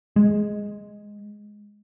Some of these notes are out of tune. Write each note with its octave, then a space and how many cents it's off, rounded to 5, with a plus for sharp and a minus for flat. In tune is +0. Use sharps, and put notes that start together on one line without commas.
G#3 +0